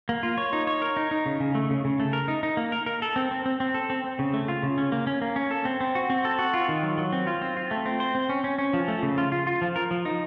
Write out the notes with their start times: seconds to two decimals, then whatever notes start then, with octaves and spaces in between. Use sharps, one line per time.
0.09 A#3
0.23 F4
0.38 C#5
0.53 D#4
0.67 C#5
0.82 A#4
0.97 D#4
1.11 D#4
1.26 C#3
1.40 C#3
1.55 A3
1.70 C#3
1.85 C#3
2.00 A3
2.13 A#4
2.28 D#4
2.43 D#4
2.57 A#3
2.72 A#4
2.86 A#4
3.02 A4
3.16 C4
3.31 C4
3.46 C4
3.60 C4
3.74 A4
3.90 C4
4.04 C4
4.19 C#3
4.34 A3
4.48 F4
4.63 C#3
4.78 C#4
4.92 A#3
5.07 C#4
5.22 A#3
5.36 C#4
5.51 A4
5.65 C4
5.80 C4
5.95 F#4
6.10 C4
6.25 A4
6.39 F#4
6.54 F4
6.69 D#3
6.83 F#3
6.98 F#3
7.13 C4
7.27 F4
7.42 C4
7.57 F4
7.71 A3
7.86 C4
8.00 C5
8.15 C4
8.29 C#4
8.44 C#4
8.58 C#4
8.73 F3
8.88 A3
9.03 C#3
9.18 F4
9.32 F4
9.47 F4
9.62 F3
9.76 A#4
9.91 F3
10.05 D#4